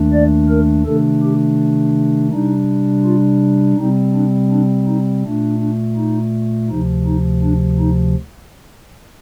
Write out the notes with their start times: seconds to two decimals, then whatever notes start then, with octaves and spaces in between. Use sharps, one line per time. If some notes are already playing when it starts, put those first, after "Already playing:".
Already playing: D#2 D#3 A3 D4
0.13 D5
0.49 A#4
0.86 C3 D#3 A3 D4 A4
1.22 G4
2.31 C3 G3 D4 D#4
3.05 F4
3.77 C3 G3 C4 D#4
4.14 D4
4.51 D4
4.86 D#4
5.24 A#2 A3 D4
5.60 D4
5.96 D#4
6.69 D2 C3 F3 D#4
7.06 D#4
7.43 D4
7.79 D#4